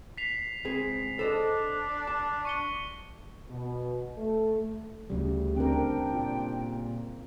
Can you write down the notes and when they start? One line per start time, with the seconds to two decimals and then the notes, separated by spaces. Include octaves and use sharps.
0.18 B6 C7 F7
0.65 C#2 C4 G#4
1.19 D4 A4 C5 D#5
2.07 A5
2.45 C#6 C#7 G7
3.49 B2
4.17 A3
5.10 D2 C#3 G3
5.56 C4 D4 A#4 G5
6.13 A#2